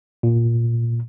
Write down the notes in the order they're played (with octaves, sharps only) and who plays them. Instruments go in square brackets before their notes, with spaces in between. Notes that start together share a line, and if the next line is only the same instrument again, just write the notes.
[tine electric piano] A#2